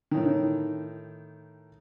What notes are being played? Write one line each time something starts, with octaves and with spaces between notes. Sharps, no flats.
A2 D#3